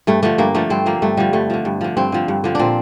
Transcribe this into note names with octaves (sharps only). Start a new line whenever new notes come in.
G2 A3
D3 F3 A3
G2 A#3
D3 F3 A3
G2 C4
D3 F3 A#3
G2 A3
D3 F3 G3
G2 A3
D3 F3
G2
D3 F3
G2 C4
D3 F3
G2
D3 F3
A#2 C4 D4